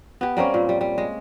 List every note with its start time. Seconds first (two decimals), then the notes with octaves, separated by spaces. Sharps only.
0.21 B3 G4
0.37 G3 A#3 C4 C#4
0.54 A#2
0.69 G3
0.81 G3
0.98 G#3